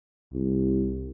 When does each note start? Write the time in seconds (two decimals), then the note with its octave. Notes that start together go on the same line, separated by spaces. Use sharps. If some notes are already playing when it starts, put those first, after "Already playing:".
0.33 C2